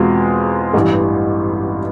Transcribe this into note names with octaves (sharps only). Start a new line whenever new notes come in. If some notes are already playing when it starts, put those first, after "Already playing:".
Already playing: E2 B2 G#3 C4 F4
A1 G2 E3